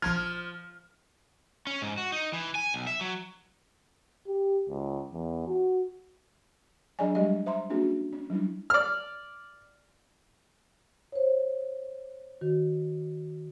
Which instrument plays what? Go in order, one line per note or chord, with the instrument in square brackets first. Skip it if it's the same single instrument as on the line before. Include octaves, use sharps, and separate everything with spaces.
[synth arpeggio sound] A#1 A5 G#6 [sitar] F3 [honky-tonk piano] F6
[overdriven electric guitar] C#4
G#2
F#4
D#4
E3
G#5
B1
E5
F#3
[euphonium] G4
C#2
E2
F#4
[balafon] F#3 D4 G#4 D5 D#5 G#5
G3 G#3 G4 D#5
C5 E5 A#5 C6
A#3 C#4 D4 F#4 G#4
C#4
F#3 G3 D4 E4
[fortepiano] D5 F6
[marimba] C5 C#5
D#3 F#4